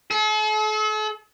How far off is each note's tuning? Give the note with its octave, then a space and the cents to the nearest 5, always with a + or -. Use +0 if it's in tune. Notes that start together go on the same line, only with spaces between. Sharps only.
A4 -45